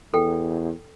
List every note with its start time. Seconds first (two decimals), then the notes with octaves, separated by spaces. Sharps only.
0.14 E2 A4 G5